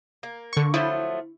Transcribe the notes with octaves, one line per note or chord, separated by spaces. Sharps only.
A#3
D3 C#6
F3 F#3 A3 E4